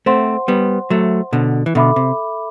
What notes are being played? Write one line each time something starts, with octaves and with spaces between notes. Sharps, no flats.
A3 C4 C5 F#5 C6
G3 B3
F#3 A3
B2 D3
E3
B2 D3 A4 E5 B5 D6
C3